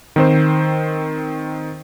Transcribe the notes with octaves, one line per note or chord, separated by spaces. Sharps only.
D#3 C4 C5